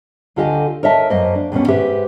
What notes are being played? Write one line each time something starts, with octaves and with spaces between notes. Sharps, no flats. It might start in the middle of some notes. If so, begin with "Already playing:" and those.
D2 D3 F4 G4 D#5 G#5
A#4 C#5 D#5 E5 A5
F#2 A#3 C5 D#5
D4
D#2 B2 C#4
G#2 G4 B4 C5 E5